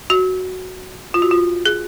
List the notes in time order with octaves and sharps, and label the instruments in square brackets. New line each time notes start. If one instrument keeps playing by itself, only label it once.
[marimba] F#4
F4
F#4
F4
G#4